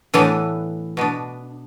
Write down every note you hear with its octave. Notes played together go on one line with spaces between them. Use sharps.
A2 E3 B3 D4 A4
B2 B3 D4